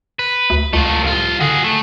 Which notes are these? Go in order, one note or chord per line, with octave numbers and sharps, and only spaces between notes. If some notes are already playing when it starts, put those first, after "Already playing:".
B4
D2
C#2 A3 F4
C2 F4
D3 F#4 G#4
A3